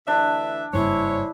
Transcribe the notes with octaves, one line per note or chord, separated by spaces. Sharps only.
D2 E3 D4 E5
F#1 G2 E4 G#4 C5 C#5